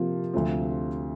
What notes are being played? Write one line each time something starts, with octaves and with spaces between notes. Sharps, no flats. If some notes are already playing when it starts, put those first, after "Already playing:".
Already playing: C3 F3 A#3 F4
D2 C3 F3 C4 F4